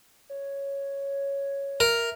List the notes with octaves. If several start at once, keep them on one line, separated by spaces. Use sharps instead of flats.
C#5
A#4 E5